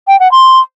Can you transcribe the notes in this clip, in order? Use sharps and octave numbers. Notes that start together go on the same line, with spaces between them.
G5
F#5
C6